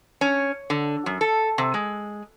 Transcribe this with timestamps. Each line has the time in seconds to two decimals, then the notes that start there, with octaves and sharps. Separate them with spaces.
0.21 C#4
0.70 D3
1.06 F#2
1.21 A4
1.58 C3
1.74 G#3